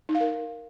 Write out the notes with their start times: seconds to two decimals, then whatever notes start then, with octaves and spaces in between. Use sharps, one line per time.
0.09 D#4
0.15 F5
0.20 A#4